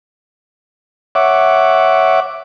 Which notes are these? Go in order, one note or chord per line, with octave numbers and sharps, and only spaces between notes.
C#5 E5 F#5 D6